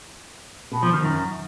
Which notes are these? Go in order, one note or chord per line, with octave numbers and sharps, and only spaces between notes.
B2
F3
D#3
F#2